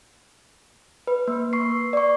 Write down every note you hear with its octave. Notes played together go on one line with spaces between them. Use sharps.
B4
A#3 B4
C#6 C7
D5 C#6